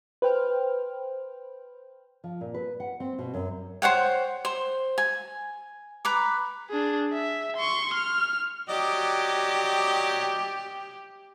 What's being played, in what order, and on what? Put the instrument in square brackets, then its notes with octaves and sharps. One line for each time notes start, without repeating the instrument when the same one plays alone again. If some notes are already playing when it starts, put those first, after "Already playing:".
[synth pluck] B4 C5 G5 F6
[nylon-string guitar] F3
A#2
B4
F#5
C4
B2
F#2
[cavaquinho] C5 C#5 F#5 G5
C5
G#5
B4 A#5 D6
[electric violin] D4 G#4
E5
C6 C#6
F6
[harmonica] F#3 D5 D#5 [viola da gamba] G4